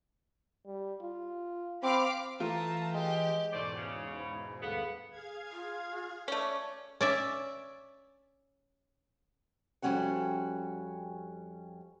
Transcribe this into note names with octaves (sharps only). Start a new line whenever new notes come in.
G3
F4
C4 F5 B5 D6
E3 A3 F4 A5 A#5
G#3 G4 G5
E2 G#2 B2 A3 C5 D5
C#3
C5 B5
D2 G2 B3 G#4 A4 F5
G#4 F5 G#6
F4
A3 C#4 D5
C#4 D5 E5
F2 E3 G3 C#4 F#4 F#5